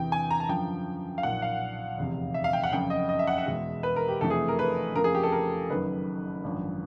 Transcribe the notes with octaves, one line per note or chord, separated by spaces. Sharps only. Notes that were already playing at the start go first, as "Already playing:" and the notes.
Already playing: E2 C3 E3 G5
G#5
A#5
A5
F#2 D3 F3 G5
F5
B1 A#2 F3 F#5
F5
F1 E2 C3
E5
F5
G5
F#5
F#1 F2 C#3 G5
D#5
D#5
E5
F#5
E5
E2 B2 G#3
B4
A#4
G4
F1 F2 C3 E3 A3 A4
G#4
A#4
B4
F2 C#3 F3 A#3 A#4
G#4
G4
A4
A#4
F#1 F#2 D#3 B4
G#1 F#2 D3 F3